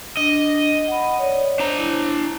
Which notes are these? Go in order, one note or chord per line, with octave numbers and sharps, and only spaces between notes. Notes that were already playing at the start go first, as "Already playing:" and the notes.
D4 D#5
F#5 B5
C#5 D5
D4 C5 A#5
E4